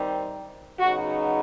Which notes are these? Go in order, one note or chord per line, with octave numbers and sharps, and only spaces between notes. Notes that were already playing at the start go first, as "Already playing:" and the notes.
Already playing: D#3 G3 C4 D#4
C#3 F#3 B3 D#4 F#4